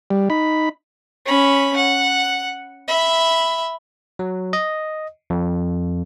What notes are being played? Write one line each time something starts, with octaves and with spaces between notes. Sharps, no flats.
G3
D#4 B5
C#4 B5
F#5
E5 B5
F#3
D#5
F2